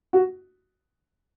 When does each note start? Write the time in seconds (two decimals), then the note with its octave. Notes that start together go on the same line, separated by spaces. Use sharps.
0.13 F#4